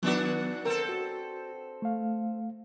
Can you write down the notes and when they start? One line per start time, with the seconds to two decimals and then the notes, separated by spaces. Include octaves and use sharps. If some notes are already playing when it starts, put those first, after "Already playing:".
0.03 D#3 F#3 B3 D4 F#4
0.65 C4 A4 A#4
0.89 F#4
1.82 A3 F5